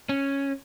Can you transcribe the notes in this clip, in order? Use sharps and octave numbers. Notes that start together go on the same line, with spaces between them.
C#4